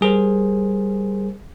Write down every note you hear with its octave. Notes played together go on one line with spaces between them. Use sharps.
G3 G#4 A#4 C5